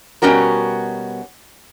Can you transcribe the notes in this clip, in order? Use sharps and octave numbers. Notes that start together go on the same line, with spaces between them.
B2 G3 B3 C#4 F#4 A#4